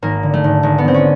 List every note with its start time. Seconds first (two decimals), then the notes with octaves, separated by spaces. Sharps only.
0.02 G#1 A#3
0.23 D3
0.34 A3
0.44 G#1
0.63 G#1
0.78 B3
0.85 D3 C4
0.94 C#4